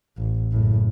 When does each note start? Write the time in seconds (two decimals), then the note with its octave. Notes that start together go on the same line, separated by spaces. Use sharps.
0.18 A1
0.52 F#1 A2